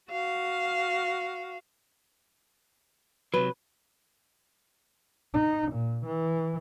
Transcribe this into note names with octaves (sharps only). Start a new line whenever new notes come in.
F#4 F5
C3 F#3 B4
D#4
A#2
E3